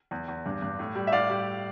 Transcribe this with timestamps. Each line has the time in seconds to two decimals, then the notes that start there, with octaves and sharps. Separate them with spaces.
0.11 E2
0.28 E2
0.46 G2
0.62 G2
0.79 A2
0.95 G3
1.07 E5
1.12 A2 D5 F5
1.30 G3